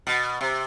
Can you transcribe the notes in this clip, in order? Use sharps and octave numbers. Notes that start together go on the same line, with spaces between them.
B2
C3